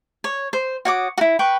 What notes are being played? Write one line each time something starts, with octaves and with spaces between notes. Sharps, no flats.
C#5
C5
F#4 C#5 D6 D#6
E4 F#4
B4 G5 C#6